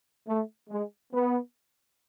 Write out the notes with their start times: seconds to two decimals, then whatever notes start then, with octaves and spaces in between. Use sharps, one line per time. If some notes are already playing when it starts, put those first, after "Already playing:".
0.27 A3
0.70 G#3
1.12 B3